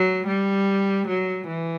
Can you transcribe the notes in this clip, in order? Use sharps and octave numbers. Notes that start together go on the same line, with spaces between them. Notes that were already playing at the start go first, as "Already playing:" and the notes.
Already playing: F#3
G3
F#3
E3